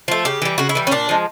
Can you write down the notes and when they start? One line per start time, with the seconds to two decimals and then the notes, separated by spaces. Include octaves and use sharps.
0.08 F3 A3
0.25 C#3 G4
0.42 E3 G3
0.58 C#3 F#4
0.69 E4
0.75 E3 G3
0.87 C#4
0.92 A#2 D4
1.09 F3 G#3